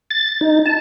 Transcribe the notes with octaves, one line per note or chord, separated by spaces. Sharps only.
A6
D#4
A5